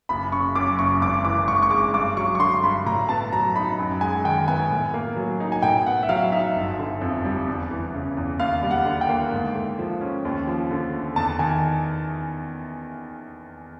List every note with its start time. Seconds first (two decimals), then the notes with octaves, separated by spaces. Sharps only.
0.09 F#1 B5
0.32 C#3 C#6
0.55 F#2 D6
0.79 F#1 C#6
1.02 G#1 D6
1.25 E3 D6
1.47 G#2 C#6
1.62 C#6
1.70 G#3 D6
1.94 G2 D6
2.17 F#3 C#6
2.35 C#6
2.40 D3 C6
2.63 G2 B5
2.86 A2 A#5
3.09 B3 A5
3.32 F#3 A#5
3.56 D#4 B5
3.79 F#2
4.01 G#3 G#5
4.24 D#3 G5
4.48 B3 G#5
4.71 A2
4.94 A#3
5.17 F#3
5.40 D#4
5.52 G#5
5.62 A2 G5
5.86 B3 F#5
6.03 E5
6.09 F#3 F5
6.32 D#4 E5
6.56 G1
6.79 D3
7.01 F2
7.25 G3
7.47 E2
7.71 E3
7.94 C#3
8.17 E2
8.39 D#2 F5
8.63 G3
8.71 F#5
8.86 D3
9.01 G5
9.09 A#3
9.32 G#2
9.55 A3
9.79 F3
10.01 C#4
10.25 D#2
10.47 F3
10.71 D3
10.94 A3
11.16 E2 A5
11.39 D#3 G#5